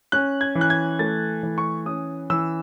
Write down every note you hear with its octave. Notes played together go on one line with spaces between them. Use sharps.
C#4 F#6
G#6
E3
F#6
G#6
A3 A6
E3
C#6
C#4 D#6
E3 E6